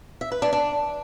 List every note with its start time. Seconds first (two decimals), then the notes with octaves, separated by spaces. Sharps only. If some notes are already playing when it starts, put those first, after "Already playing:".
0.21 E5
0.32 B4
0.42 D4
0.53 D4